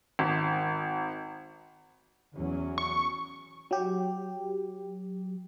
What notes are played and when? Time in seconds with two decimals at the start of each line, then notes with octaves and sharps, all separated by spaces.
0.19 G#1
2.34 E2 F#3 C#4
2.78 C#6
3.71 F#3 G4